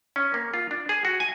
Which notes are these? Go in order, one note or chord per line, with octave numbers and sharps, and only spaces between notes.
C#4
A#3
F4
D4
G#4
F#4
G#5